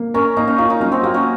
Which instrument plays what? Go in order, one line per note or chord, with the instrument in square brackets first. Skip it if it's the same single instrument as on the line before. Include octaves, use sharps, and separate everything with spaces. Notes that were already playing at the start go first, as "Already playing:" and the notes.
Already playing: [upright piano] A#3
[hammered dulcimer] C#4 [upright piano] A#4
[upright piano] A#3 [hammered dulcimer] D#4
[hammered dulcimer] C#4
[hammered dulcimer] D#4 [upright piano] F4
[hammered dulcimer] D#4
[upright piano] F#3 [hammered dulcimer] C#4
[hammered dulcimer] C4
[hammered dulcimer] A#3 [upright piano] F#4
[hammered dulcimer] C#4